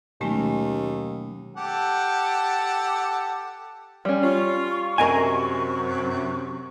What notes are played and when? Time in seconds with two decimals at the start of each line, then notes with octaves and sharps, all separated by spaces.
0.21 D#2 B2 D#3 F#3 G#3 A3 C#4
1.57 G4 A4 F#5
4.05 G3 C#4
4.24 F4 C#6
4.98 F#2 C3 A#4 D#5 G#5